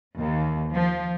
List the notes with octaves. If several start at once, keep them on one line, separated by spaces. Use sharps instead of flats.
D#2
F3